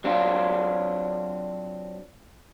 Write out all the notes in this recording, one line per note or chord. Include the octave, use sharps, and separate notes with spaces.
F#3 C4 D4 F4